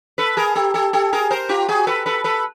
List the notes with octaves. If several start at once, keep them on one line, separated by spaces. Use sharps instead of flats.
A4 B4
G#4 A#4
G4 A4
G4 A4
G4 A4
G#4 A#4
A#4 C5
F4 G4
F#4 G#4
A4 B4
A4 B4
A4 B4